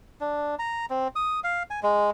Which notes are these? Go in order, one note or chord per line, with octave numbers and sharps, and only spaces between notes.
D4
A#5
C4
D#6
F5
G#5
G#3